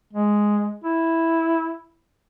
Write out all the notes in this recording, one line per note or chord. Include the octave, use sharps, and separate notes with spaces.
G#3
E4